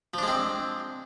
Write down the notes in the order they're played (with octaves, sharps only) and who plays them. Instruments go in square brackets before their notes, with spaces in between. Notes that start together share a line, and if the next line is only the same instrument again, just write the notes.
[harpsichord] F3
D4
G#3
C4